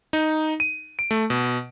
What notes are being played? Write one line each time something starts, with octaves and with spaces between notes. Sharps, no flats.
D#4
D#7
D7
A3
B2